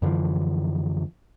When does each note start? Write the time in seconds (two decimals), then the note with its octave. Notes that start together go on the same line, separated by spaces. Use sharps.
0.02 F#2 D3 E3 F3